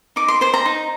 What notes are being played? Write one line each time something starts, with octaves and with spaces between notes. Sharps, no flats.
D#4 D6
C6
C5 C6
A#5
D#4